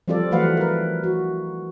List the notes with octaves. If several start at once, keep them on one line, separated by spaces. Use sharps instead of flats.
F3 G3 C4 F4 A4 D5
E3 F#3 A3 B4 F5 F#5
A#4 B4
F#4